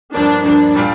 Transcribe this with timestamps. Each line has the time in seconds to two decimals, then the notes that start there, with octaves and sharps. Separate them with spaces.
0.14 G2 F3 A#3 D4
0.44 G2 F3 A#3 D4
0.75 A#2 G3 D4 F4